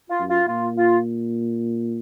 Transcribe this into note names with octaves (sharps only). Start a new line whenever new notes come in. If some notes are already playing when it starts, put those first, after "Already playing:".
F4
F#2
F4
A#2 F4
F4